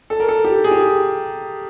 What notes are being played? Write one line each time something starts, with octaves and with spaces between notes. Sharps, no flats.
A4
A#4
A4
G4
G#4
G4